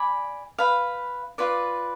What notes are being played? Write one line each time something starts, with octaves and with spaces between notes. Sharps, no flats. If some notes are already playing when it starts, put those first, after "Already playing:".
Already playing: D5 G#5 B5
B4 F5 B5
F4 B4 D5